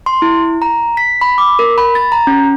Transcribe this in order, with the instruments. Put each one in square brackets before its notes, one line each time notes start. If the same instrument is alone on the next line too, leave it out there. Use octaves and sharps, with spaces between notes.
[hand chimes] C6
E4
A#5
B6
B5
D6
A#4
B5
A6
A#5
C#4